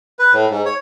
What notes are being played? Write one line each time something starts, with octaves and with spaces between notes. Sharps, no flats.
B4
A2
G#2
C#5